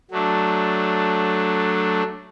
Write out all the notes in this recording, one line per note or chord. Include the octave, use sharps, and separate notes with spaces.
F#3 A3 D4